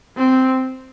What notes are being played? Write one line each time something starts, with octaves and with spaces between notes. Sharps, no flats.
C4